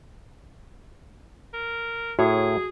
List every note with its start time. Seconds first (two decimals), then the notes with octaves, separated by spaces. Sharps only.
1.53 A#4
2.19 A2 F#4 G#4 C#5